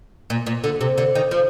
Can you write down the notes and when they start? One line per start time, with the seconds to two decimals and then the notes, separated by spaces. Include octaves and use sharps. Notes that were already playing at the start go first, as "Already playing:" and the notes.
0.30 A#2
0.46 A#2
0.64 D3
0.81 C3
0.98 D3
1.15 D#3
1.31 F3